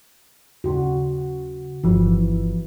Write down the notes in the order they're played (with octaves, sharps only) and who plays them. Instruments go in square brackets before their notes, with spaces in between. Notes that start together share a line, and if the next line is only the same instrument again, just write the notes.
[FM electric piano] D#2 C#3 [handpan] F#4
[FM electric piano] G1 F3 [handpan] E3